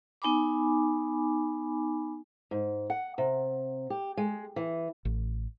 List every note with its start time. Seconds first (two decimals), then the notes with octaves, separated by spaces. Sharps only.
0.22 B3 D#4 G#5 B5 D6
2.51 G#2
2.90 F#5
3.18 C3
3.90 G4
4.17 G#3
4.56 E3
5.05 A1